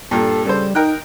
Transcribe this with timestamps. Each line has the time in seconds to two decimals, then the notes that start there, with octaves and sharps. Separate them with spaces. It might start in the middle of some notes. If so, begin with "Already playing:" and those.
0.11 G2 A#2 A4
0.45 C#3 G3 A4 C5
0.75 D#4 A#4 G5 F#6